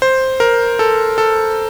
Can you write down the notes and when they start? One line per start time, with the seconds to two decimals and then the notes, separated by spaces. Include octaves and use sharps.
0.02 C5
0.40 A#4
0.79 A4
1.18 A4